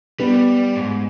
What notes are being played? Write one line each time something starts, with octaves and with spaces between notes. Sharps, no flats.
G3 B3
G#2